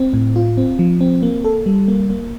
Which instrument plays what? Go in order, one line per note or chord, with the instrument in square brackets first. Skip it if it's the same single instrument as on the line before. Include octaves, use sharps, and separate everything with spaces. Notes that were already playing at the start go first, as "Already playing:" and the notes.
Already playing: [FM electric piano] C4
A2
F4
C4
F3
C4
A#3
A4
G3
A#3
A#3